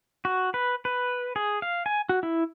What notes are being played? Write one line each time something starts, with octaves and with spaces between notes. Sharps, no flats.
F#4
B4
B4
G#4
F5
G#5
F#4
E4